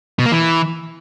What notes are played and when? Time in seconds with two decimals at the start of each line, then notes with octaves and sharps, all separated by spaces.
0.19 B2
0.25 A#3
0.32 E3